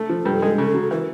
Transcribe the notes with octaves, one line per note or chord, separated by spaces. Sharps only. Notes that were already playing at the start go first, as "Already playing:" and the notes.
Already playing: A3 A4
F3
G2
G#3
C#3
F#3
E3 A#4